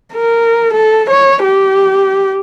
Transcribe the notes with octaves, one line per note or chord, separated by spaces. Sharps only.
A#4
A4
C#5
G4